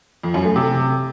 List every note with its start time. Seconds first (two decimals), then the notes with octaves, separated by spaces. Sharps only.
0.23 F2
0.34 F#2
0.45 A3
0.56 C3